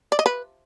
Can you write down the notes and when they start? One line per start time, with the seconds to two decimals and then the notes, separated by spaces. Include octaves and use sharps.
0.12 D5
0.19 D#5
0.26 B4